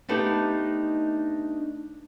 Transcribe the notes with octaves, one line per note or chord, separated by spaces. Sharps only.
A3 B3 D4 D#4 G4